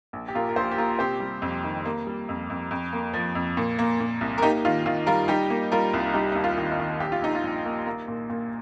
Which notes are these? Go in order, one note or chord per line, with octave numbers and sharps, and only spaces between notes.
A#1
G4
A#2 F4 A#4
A#4
A#1 G4 C5
G4
A#3 F4 A#4
C3 G4 C5
G3
F2
D#3
A#3
G3
F2
F2
F2
A#3
F3
F2
A#2
A#3
A#2
C2
A#4
A#3 D#4 G4
D#3 F4
D#3 F4
G3 F4 A#4
G3 D#4 G4
A#3
G3 F4 A#4
C2
G3 D#4 G4
D#2 D#4
F4
D#3
D#4
D#3
A#1 G4
F4
A#1 D#4
F4
A#1
A#3
A#3
A#2
A#2